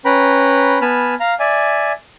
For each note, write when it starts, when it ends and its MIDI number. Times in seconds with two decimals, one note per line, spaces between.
0.05 0.79 61
0.05 0.79 71
0.05 0.79 79
0.05 0.79 82
0.05 0.79 83
0.81 1.14 59
0.81 1.14 80
0.81 1.14 81
0.81 1.14 83
0.81 1.14 89
1.20 1.34 77
1.20 1.34 82
1.20 1.34 89
1.40 1.92 74
1.40 1.92 76
1.40 1.92 80